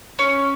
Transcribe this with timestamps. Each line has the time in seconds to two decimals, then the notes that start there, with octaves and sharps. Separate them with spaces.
0.19 C#4